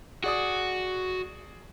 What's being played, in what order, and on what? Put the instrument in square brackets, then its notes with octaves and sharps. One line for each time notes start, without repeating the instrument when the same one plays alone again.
[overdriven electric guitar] F#4 [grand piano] G#4 D5 D#6